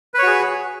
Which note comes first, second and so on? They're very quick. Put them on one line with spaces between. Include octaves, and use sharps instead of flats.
B4 C#5 F#4 G#4